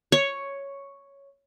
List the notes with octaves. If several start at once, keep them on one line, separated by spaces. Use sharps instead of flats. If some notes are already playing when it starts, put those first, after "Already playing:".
C#5